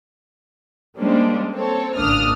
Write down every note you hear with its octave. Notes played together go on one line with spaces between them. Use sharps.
G3 G#3 A#3 C#4 D4 C5
C4 A4 C#5
G#1 C#2 A#3 D4 D#6 F6